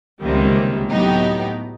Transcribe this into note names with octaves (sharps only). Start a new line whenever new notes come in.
C#2 C3 D#3 G3 A#3
A2 F#3 B3 D#4 G4